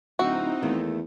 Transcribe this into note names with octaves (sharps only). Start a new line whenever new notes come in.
D1 C4 D#4 E4 F#4
E2 D#3 A3 A#3